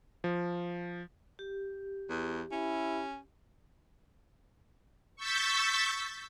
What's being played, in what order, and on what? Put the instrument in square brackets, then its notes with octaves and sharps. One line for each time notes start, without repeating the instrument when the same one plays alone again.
[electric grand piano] F3
[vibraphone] G4
[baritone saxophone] E2
[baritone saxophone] C#4 [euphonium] E4
[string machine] C#6 E6 G6 A6 B6